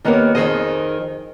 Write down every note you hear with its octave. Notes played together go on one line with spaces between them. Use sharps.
D#3 A#3 B3 G4 A#4 C#5
F2 D#3 F#4 G#4 C5 D#5